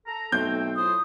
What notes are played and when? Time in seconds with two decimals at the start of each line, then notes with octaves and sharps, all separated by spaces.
0.06 A4 A#5
0.32 B1 A3 C4 G6
0.76 A2 F4 C5 D#6